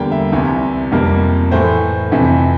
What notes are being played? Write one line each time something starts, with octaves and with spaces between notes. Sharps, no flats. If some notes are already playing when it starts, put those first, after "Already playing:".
Already playing: E2 D3 G3 A#3 G5
E5
C2 C3 E3
F2 C3 G3 A#3
A2 E3 A3 C5
F2 C3 E3